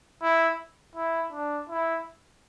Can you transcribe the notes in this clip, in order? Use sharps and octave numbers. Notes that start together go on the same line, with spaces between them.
E4
E4
D4
E4